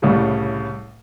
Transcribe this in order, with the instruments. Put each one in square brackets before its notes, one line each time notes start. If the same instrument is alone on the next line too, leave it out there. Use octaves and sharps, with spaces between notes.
[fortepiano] C2 A2 C#3 G3